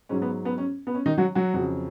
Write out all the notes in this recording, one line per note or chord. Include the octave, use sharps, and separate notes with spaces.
G#2 F#3 C#4
B3
B3
C#4
B3
C#4
D#3 D#4
F#3 F#4
F#3 F#4
F2 C#3 F#3